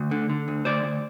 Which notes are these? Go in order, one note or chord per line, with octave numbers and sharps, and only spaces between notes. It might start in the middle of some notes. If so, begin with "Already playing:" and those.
Already playing: D2
D3
D3
D2
D2 C5 D5
D2